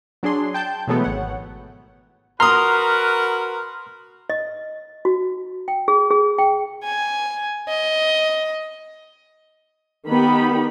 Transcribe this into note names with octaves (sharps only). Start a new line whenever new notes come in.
F#3 D4 G#4 C6
G5 A5 G6
B2 E3 F#3 G#3 A3 B3
G#1 C#5 F#5
F#4 A#4 B4 A#5 C6 D#6 F6
D#5
F#4
G5
G#4
G#4
G5
G#5
D#5
D#3 B3 D#4 G4 B5